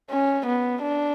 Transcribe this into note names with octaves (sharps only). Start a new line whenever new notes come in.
C#4
B3
D4